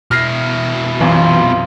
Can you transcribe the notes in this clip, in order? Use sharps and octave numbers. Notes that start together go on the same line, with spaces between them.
B2 E4 F6 A#6 C7
B1 F#2 C3 E3 F4